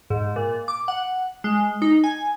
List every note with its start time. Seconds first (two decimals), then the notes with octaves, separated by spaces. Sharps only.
0.10 G#2
0.36 A#2
0.68 D6
0.88 F#5
1.44 G#3
1.82 D#4
2.04 G#5